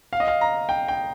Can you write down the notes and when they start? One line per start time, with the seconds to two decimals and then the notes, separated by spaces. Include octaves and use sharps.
0.13 F5
0.20 D#5
0.28 F5
0.41 A#5
0.69 G5
0.88 G5